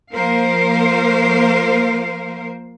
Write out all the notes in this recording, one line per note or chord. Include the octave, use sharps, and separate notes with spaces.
F3 A#3 A#4 C5 F5